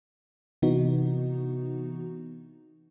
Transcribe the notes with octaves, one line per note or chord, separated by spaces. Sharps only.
C3 E3 B3 D#4 F#4